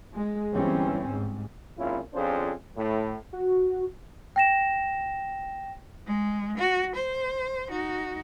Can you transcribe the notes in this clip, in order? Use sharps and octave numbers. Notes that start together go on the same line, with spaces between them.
G#3
G1 E3 G3 C4 C#4
G#2
G#1 A#2 C#4 E4 F4
F2 C#4 D4 F4 G#4 C5
A2
F#4
G5 A#6 E7
G#3
F#4
C5
D#4 F#4